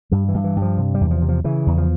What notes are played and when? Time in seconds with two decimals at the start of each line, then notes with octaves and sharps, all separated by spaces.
0.11 G2 G3
0.29 E3
0.34 G2
0.44 E3
0.56 G2
0.62 F3
0.78 C3
0.94 G3
1.01 E2
1.11 F3
1.22 C3
1.29 F3
1.44 C#3 E3
1.67 E2
1.78 F3